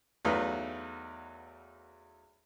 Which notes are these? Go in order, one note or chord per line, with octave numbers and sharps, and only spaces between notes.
E2 F#3 A3 D#4 F4 B4